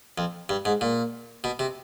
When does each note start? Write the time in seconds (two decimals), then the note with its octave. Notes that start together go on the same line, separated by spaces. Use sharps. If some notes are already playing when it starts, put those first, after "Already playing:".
0.18 F2
0.49 G2
0.65 G#2
0.81 A#2
1.44 B2
1.59 C3